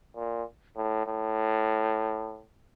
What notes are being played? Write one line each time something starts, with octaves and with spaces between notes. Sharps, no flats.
A#2
A2
A2